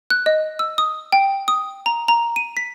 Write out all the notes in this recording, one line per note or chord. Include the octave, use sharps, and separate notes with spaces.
F#6
D#5
E6
D#6
G5
D#6
A#5
A#5
D#7
B6